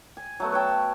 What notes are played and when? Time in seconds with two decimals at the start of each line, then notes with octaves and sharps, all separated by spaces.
0.17 G#5
0.40 F#3 A3 B3
0.52 B4 C#5 G5 A5